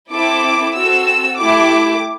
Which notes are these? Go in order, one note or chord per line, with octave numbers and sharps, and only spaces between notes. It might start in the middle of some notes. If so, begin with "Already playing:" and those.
C4 E4 A4 D6
C4 F#4 A4 E6
A3 E4 G4 D6